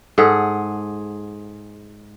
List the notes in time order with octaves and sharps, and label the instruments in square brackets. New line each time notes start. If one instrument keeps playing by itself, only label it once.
[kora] G#2 G#4 [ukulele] A4 F#5